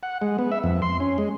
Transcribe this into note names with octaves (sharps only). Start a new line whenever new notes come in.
F#5
G#3
B3
E5
F2
C6
C#4
G#3